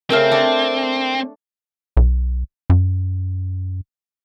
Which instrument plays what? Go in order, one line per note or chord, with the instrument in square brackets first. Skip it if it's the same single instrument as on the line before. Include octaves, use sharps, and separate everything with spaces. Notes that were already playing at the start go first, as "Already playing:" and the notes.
[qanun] C#3 A3 G5 [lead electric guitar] C4 [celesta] A#4 F6
[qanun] D4 A4
[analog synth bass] B1
F#2